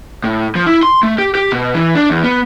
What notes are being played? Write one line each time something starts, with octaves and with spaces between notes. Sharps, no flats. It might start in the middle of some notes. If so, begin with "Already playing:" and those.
A2
F3
E4
C6
A3
G4
G4
B2
E3
D4
E2
B3